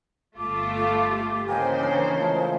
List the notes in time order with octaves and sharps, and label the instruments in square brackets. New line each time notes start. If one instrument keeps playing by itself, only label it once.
[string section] G1 A3 F4 [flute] D6
[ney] F5
G4
[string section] C#3 E3 C5 [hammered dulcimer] A#3 D#5 [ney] G5 [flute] G#5
[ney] D4 [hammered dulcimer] G#4 A#4 [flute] C#5
[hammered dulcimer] F3 G#3 [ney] A3